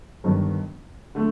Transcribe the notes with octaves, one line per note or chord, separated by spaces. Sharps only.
G1 G2 D#3
D3 A3